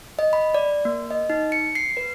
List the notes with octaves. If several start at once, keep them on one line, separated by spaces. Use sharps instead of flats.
D#5
B5
D5
A#3
D#5
D#4
C#7
C7
B4